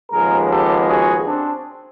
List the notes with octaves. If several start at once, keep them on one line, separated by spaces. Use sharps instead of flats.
D#2 C#3 F3 G#3 B3 G#4 A#4
G4 A4
F#4 G#4
C4 D4